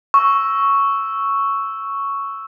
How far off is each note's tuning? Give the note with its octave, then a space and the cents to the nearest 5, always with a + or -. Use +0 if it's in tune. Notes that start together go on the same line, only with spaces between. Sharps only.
C#6 +0 E6 +0